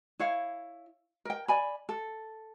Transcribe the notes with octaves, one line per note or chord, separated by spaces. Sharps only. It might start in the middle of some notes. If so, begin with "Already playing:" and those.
E4 C#5 F5
A#4 G5
D5 G#5 B5
A4